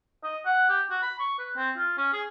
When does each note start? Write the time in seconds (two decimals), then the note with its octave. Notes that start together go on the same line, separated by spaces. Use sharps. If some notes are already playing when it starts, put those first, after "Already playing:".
0.24 D#5
0.45 F#5
0.69 G4
0.90 F#4
1.02 B5
1.19 C#6
1.39 B4
1.56 C4
1.77 F4
1.97 C#4
2.13 G#4